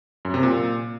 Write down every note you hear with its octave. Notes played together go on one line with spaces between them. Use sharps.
F#2
C3
A#2